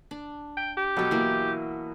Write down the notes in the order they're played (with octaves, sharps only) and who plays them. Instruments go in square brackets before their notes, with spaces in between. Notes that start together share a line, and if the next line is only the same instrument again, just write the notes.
[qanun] D4
[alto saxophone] G5
G4
[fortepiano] B2 F#3 F#4 [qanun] A4 C#5
[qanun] E3 A#3